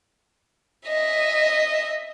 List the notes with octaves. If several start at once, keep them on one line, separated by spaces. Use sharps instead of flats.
D#5 E5